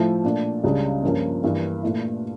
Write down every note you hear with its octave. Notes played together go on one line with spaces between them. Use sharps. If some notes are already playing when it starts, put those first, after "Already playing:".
Already playing: A2 F3 A3 E4
A#2 A3 D4
C#2 C#3 G3 D4
G2 F3 A#3 C#4 F4
G2 E3 A#3
A#2 A3 E4